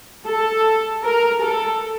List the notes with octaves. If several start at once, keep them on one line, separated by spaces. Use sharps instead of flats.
A4
A#4
A4